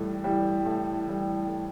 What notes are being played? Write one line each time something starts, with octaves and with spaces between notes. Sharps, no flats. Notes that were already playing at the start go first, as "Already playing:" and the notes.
Already playing: A2 E3 G3
E3 G3
A2
E3 G3
A2